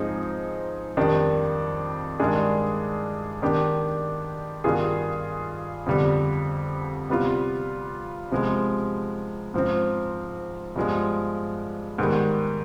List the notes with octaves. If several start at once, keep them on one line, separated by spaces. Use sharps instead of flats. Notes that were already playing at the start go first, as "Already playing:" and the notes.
Already playing: G#2 F3 C4 D#4 G#4
F2 D#3 G3 D4
G2 D#3 G#3 D4 G#4
D#3 B3 D4 G4
G2 D#3 B3 F4 G#4
F2 D3 G3 B3
C3 G3 B3 F4
C3 F3 G#3 B3
G#2 F3 C4
G2 F3 G#3 B3
G#2 D#3 G3 B3